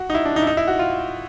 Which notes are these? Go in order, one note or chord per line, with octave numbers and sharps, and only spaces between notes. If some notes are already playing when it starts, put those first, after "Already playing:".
Already playing: F#4
D#4
E4
D4
D#4
E4
D#4
E4
F#4
F4